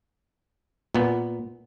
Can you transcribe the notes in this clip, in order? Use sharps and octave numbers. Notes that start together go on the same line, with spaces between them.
A#2 B3